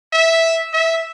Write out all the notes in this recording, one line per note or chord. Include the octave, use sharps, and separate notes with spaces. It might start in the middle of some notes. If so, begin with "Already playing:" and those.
E5
E5